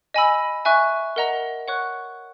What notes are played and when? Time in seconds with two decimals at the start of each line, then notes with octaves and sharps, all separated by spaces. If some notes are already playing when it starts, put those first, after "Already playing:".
0.14 D#5 G#5 B5 E6
0.65 E5 G#5 C#6 F#6
1.16 A#4 D#5 F#5 A#5
1.68 C#5 F#5 C#6 F#6